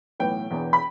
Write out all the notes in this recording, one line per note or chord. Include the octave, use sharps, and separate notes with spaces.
B1 A2 E3 B3 G5
E1 E2 E3 B3
B5